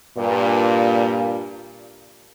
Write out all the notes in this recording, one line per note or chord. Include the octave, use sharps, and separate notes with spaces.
G2 A#2